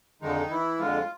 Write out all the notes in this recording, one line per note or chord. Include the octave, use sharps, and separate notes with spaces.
F2 D3 D#3 F3 G#3 D#4
E3 E4
F2 D3 F3 G#3 F4